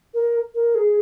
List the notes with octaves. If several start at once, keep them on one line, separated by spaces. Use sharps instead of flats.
A#4
A#4
G#4